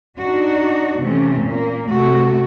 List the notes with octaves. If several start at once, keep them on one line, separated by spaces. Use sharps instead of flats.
D4 D#4 F#4
C3 E3 A3 C4 C#4
A#2 A#3
C3 A3 F#4